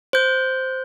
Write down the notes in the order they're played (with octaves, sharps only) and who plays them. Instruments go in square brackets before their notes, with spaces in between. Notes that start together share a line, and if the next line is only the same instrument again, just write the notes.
[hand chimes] C5 G6